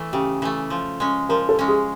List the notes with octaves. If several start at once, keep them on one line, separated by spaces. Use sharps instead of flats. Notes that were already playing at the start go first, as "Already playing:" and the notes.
Already playing: E3 A3
C#3 G4
E3 A3
F3
G#3 C#4
F3 A#4
A4
G#3 C#4
G#4